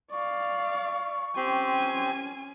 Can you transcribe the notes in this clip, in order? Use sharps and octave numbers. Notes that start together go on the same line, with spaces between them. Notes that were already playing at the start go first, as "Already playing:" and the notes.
D5 F5 C#6
C4 C#4 G4 G#5 C6